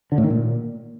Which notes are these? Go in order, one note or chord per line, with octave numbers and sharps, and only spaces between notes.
D3
A2
D#3
A#2